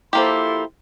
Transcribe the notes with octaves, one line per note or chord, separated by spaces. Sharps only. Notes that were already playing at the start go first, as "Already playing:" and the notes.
F3 A#3 E4 G4 A4 C6